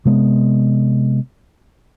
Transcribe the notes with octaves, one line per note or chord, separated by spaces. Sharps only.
C3 G#3 B3